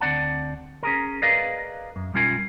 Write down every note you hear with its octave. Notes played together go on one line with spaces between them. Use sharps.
D2 C4 D5 F#5 A5
C#4 G#4 A#4
G#4 A#4 B4 D5 D#5 F5
F#2
B1 G3 C#4 F4 A#4 G#5